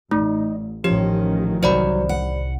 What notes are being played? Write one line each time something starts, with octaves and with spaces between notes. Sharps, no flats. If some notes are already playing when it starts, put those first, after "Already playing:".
A1 A3 D#4
A1 D#3 F3 C#4 G4
C2 F#3 C5 D5 B5
F#5